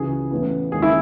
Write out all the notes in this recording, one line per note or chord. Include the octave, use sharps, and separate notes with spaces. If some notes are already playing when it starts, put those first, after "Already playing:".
Already playing: C#2 C#3 E3 F#4 G#4
A1 A2 E3 B3
D#2 C#3 G#3 G#4
E4